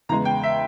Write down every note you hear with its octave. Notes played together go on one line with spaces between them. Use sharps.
E2 C#3 E3 G#3 A#5
G5
E5